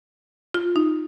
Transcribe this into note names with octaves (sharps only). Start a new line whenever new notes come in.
F4
D#4